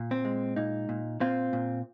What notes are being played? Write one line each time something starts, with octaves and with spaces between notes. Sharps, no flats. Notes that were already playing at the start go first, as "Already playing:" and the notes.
Already playing: A#2
C4
G#3
A#2 D#4
A#2
A#2 C4 F4
A#2